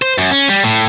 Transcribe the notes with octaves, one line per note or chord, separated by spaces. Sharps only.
C5
F#2
C#4
G3
A2